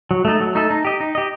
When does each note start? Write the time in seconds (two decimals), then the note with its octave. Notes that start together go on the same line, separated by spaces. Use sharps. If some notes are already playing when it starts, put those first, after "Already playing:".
0.11 F#3
0.25 A3 D#4 A4
0.40 F#3
0.55 A3 D#4 A4
0.70 D#4
0.85 G4 D#5
1.00 D#4
1.15 G4 D#5